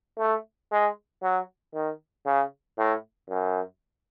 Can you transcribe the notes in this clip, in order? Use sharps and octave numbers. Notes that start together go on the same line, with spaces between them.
A3
G#3
F#3
D#3
C#3
A2
F#2